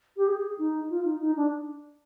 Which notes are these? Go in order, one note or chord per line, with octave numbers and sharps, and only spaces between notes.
G4
G#4
D#4
F4
D#4
D#4
D4